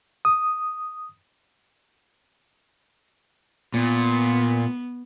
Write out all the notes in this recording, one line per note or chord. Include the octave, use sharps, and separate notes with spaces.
D#6
A#2 B3